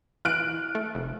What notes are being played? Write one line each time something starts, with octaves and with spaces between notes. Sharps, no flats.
E3 F6 F#6 D7
A3
F1